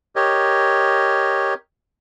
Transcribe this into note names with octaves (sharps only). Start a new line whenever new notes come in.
G4 A#4 C#5 D#5